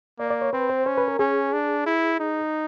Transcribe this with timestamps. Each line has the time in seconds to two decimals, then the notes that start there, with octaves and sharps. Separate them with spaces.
0.19 A#3 D5
0.30 D5
0.41 C#5
0.53 C4 B4
0.69 C5
0.86 C#4 C5
0.97 B4
1.08 A#4
1.19 C#4 G#4
1.53 D4
1.86 E4
2.20 D#4